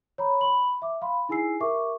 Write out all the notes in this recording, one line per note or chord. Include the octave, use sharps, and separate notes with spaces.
C#5 A#5 B5
B5 C6 F#7
E5 D6
F5 B5 C6
D#4 E4 G#4 G#5 E6 C7
G4 A#4 E5 C#6 D6